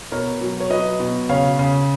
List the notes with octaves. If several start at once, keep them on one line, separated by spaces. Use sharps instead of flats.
B2 A#4 C#5
F#3
C#5
F#3 B4 D#5
B2
C#3 C#5 F5
C#3